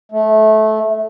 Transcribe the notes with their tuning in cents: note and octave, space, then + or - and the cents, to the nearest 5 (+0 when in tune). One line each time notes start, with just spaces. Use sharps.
A3 -20